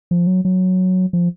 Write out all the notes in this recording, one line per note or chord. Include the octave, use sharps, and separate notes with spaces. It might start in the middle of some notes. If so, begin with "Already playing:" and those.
F3
F#3
F#3
F3